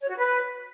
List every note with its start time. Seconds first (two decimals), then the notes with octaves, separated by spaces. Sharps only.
0.02 C#5
0.10 F#4
0.18 B4